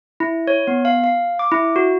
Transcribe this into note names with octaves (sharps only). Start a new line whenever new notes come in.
E4
C#5
B3
F5
F5
D6
E4
F#4